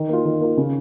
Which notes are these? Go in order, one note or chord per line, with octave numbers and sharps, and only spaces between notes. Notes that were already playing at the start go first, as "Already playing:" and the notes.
Already playing: D#3
A#3 F4
D#3
A#3 F4
C#3